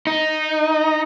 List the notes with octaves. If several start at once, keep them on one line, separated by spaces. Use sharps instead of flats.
D#4